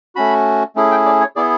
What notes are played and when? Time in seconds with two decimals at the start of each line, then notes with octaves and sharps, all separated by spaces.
0.15 A3 C#4 F#4 B5
0.76 A3 C#4 E4 G#4
0.91 G5
1.06 D5
1.21 C#5
1.36 B3 E4 G#4 D5